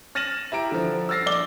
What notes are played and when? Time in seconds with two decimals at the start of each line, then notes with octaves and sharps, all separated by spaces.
0.15 F6 A6 A#6 D#7 E7 F#7
0.52 E4 G4 A#5 D7
0.71 D3 F3
1.09 E6 F6 A6 A#6 C7
1.26 A#1 D5 G7